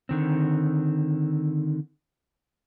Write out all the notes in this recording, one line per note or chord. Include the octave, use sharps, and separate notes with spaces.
D3 D#3 C4